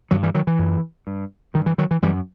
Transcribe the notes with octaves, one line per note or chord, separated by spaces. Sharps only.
G2 D#3 F#3
E3 G3
D#3 F#3
E3
F#2
G2
G2 D#3
E3
D#3 F#3
E3
F#2 E3 G3